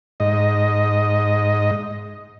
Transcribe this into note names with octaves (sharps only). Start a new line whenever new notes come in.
G#2 D#5